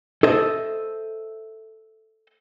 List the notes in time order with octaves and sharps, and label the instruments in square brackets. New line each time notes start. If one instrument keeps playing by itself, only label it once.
[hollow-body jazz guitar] A4 C5 D#5 E5